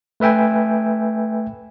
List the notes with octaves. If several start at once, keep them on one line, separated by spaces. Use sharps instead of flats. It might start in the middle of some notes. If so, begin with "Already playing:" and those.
A3 B4 E5 G5 G#5